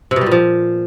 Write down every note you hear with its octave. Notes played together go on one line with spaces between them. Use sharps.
C3
B2
G3
A#2
F3